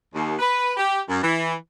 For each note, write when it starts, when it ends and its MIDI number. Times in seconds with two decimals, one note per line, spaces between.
0.14 0.34 39
0.39 0.72 71
0.76 0.99 67
1.08 1.21 42
1.22 1.53 52